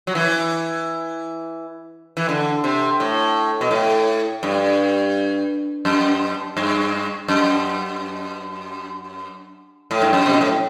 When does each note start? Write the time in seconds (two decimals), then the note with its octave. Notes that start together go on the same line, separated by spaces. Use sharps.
0.07 F#3
0.15 E3
2.17 E3
2.29 D3
2.64 C3
3.00 A2
3.61 B2
3.71 A2
4.43 G2
5.85 F#2
6.57 G2
7.28 F#2
9.91 A2
10.02 G2
10.13 F#2
10.26 C3
10.34 B2
10.41 A2